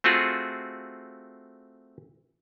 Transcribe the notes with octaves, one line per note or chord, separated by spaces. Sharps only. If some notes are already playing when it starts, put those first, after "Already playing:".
A3 C4 F4 F#4 G#4